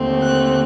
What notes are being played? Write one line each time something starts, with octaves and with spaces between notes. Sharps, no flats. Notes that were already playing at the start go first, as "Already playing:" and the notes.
Already playing: D#2 D3 A3 C4
F#6